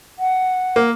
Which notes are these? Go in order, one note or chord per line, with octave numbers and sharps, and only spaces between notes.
F#5
A#3